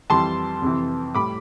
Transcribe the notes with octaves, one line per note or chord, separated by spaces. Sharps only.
F2 E3 G3 A5 C6
F2 C3 E3
A2 G3 B5 D6